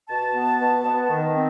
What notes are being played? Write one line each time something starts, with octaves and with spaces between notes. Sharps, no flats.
B2 A5
B3
B2
B3
D#3
C4